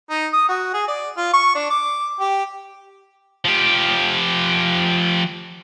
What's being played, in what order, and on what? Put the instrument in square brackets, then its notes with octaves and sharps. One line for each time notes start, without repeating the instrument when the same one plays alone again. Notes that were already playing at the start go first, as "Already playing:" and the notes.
[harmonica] D#4
D#6
F#4
G#4
D5
F4
C#6
D4
D6
G4
[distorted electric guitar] F3 G4